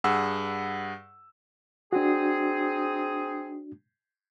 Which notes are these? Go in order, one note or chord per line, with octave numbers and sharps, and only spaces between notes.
G2 G#4 F#5 E6
C4 D4 D#4 F#4 G#4